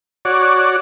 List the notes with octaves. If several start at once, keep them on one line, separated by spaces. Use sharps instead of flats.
F#4 C#5 D5